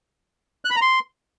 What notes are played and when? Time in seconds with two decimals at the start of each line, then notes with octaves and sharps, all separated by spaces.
0.65 F#6
0.70 B5
0.76 A#5
0.81 C6